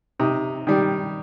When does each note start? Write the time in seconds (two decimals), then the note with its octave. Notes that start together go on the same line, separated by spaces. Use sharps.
0.19 C3 D#4
0.67 D#3 G3